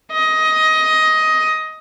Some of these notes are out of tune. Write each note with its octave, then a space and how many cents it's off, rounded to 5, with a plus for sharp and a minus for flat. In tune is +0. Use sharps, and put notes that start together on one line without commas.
D#5 +15